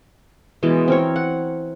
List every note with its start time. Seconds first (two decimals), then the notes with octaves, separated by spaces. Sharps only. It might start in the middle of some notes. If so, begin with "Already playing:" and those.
0.63 B2 E3 G#3
0.88 C4 A#4 C#5
1.16 F#5